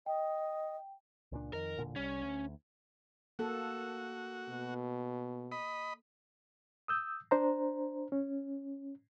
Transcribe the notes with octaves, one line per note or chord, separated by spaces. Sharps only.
D#5 G5
C#2 A#2 D4
F2 D#3 A#4
E1 A#2 D3
C2 G3 C#4
D2
A#3 F#4 A4
B2
D#5 B5
D#6 E6 G6
D4 C5 A#5
C#4